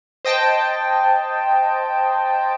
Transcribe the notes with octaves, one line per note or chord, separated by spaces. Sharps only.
C5 D#5 G5 A5